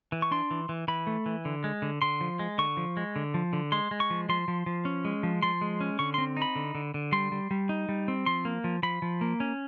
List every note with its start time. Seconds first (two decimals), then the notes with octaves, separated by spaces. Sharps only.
0.12 E3
0.22 C#6
0.31 D4 C6
0.51 E3
0.69 E3
0.88 E3 B5
1.07 A3
1.26 E3
1.45 D3
1.64 G#3
1.82 D3
2.02 D3 C6
2.21 F3
2.39 G#3
2.58 D3 C#6
2.77 F3
2.97 G#3
3.16 D3
3.34 F3
3.53 D3
3.72 G#3 C6
3.91 G#3
4.00 C#6
4.10 F3
4.29 F3 C6
4.48 F3
4.66 F3
4.85 C#4
5.05 G#3
5.23 F3
5.43 F3 C6
5.61 G#3
5.81 C#4
5.99 D3 C#6
6.14 C4 C6
6.37 D#4
6.42 B5
6.56 D3
6.75 D3
6.94 D3
7.12 G3 C6
7.32 G3
7.51 G3
7.69 D#4
7.89 G3
8.08 C4
8.26 F3 C6
8.45 A#3
8.64 F3
8.83 F3 B5
9.02 F3
9.21 A#3
9.40 C#4